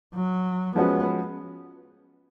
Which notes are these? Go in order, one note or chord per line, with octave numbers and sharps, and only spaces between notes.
F#3
F3 G#3 B3 C#4 F#4